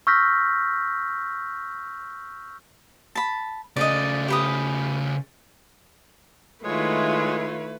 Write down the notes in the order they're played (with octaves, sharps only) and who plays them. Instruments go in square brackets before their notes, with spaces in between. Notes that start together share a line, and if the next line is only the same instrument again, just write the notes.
[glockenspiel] C#6 E6 F6 G6 A#6 B6
[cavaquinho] A5 B5
[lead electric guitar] C#3 A3 [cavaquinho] D5 D#5
[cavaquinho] G4 B4 D#6
[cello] D#3 F4 [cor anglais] G#3 [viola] A3 B4 [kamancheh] E4 C#5